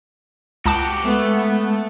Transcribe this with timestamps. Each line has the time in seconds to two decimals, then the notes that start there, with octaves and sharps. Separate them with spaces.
0.65 C#2 F#4 G4 A5 D6
1.04 G#3 A3 B3